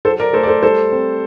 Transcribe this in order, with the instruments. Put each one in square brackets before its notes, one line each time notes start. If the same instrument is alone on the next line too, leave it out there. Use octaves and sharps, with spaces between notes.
[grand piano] F#3 A4 C5
A#4 D5
A3 A4 C5
D5
A4 C5
G3 A4 C5
C4